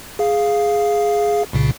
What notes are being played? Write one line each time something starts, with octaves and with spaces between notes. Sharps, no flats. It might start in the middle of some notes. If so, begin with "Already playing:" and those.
G#4 F5
C2 A#2 C#3